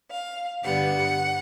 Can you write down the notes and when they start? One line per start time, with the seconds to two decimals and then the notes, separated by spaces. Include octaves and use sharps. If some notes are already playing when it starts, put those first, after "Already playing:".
0.10 F5
0.63 G2 D3 G3 B3 F#5